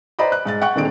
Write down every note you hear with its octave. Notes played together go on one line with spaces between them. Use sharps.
B4 C5 D5 D#5 A#5 B5
F#6
G#2 F#6 A6
F#5 G5 C#6 F#6
D#1 D#3 C4 D4 G#4 D7